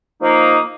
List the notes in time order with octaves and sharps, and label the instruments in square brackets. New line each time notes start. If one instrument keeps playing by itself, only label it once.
[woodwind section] F3 A#3 D#4